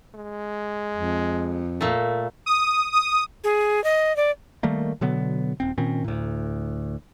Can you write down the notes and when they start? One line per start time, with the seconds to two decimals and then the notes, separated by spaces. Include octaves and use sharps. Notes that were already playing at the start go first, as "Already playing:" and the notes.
0.14 G#3
0.93 F2
1.81 A#2 A3
2.46 D#6
2.92 D#6
3.44 G#4
3.84 D#5
4.16 D5
4.63 D#3 G3 A3 A#3
5.01 B2 D3 F#3 B3
5.60 D#1 C4
5.78 A#2 D#3 C4 C#4
6.04 D2 A2